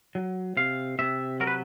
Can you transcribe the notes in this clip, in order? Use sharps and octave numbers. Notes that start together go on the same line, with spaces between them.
F#3
C3 F5
C3 E5
F#3 A#4
B4